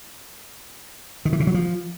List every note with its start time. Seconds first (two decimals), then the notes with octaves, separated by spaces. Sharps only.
1.25 D#3
1.33 E3
1.40 C#3
1.47 F#3
1.54 F3